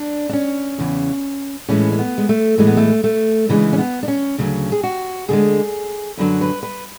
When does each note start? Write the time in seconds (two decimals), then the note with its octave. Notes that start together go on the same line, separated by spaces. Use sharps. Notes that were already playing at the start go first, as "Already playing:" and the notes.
Already playing: D4
0.29 D4
0.33 C#4
0.78 E2 C#3 E3
1.68 A2 E3 G#3 C#4
1.92 C#4
1.99 B3
2.18 G#3
2.29 A3
2.58 A2 E3 G#3 A3
2.67 B3
2.77 A3
3.04 A3
3.49 D2 C#3 E3 G#3
3.73 C#4
3.78 B3
4.03 D4
4.08 C#4
4.38 D2 C#3 F#3
4.72 G#4
4.83 F#4
5.28 D2 D3 G#3 G#4
6.17 F#2 D3 F#3 B4
6.41 B4
6.63 B4